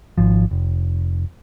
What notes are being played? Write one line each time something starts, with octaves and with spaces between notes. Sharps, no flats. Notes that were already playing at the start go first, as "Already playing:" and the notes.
G#1 F3
F1